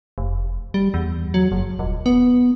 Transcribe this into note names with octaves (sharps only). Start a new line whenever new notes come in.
F1
G3
E2
F#3
F#1
D#1
B3